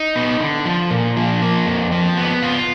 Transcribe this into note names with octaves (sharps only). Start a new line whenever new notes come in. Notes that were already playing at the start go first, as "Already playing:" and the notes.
Already playing: D#4
B3
D3
F3
A#2
F3
A#3
F2
F3
B3
F4